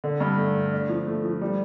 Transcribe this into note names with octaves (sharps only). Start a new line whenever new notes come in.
D3
G2
A3
A3
D4
F3
A3
F3
G3